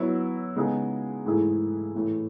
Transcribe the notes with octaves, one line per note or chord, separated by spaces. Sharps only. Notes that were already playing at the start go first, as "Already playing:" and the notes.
Already playing: F#3 B3 E4
C#3 G#3 B3 D#4 G#4
G#2 E3 A3 E4 G#4
A2 E3 A3